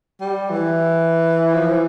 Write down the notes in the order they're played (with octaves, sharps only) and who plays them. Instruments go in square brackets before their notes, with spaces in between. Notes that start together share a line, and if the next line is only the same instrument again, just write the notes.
[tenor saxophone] G3
E3
F3
E3